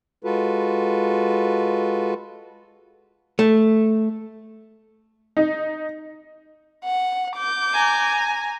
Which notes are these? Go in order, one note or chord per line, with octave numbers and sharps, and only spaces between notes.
G#3 F4 F#4 A4 B4
A3
D#4
F#5
D6 G6
G#5 A#5